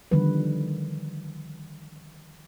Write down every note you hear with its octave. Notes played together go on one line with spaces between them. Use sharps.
D3 D#3 F3 G3 B4